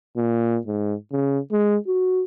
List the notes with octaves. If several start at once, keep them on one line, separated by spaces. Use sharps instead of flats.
A#2
G#2
C#3
G#3
F#4